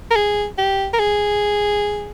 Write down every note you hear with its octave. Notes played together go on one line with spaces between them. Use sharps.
A#4
G#4
G4
A#4
G#4